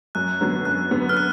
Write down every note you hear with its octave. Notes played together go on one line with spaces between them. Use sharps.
F#2 F#6
D3 F#3 B3
F#2 F#6
D3 F#3 B3
F6
F#6